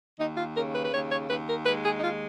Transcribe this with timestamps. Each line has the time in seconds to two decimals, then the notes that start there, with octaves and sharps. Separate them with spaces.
0.19 D#2 D#4
0.37 F4
0.56 C#3 A#4
0.74 B4
0.84 B4
0.93 D#2 C#5
1.11 C#5
1.29 D#2 B4
1.48 A#4
1.66 G#3 B4
1.85 G#4
1.99 D#4
2.03 D#2 F4